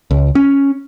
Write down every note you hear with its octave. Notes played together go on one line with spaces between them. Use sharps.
C#2
C#4